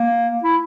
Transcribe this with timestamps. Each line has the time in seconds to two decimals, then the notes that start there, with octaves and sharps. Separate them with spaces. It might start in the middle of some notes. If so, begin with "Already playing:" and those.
Already playing: A#3
0.43 E4